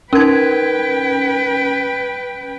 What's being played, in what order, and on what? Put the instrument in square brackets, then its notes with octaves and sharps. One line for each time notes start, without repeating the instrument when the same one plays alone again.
[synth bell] C#4 G#6 [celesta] D#4 A#4 [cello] B4 G5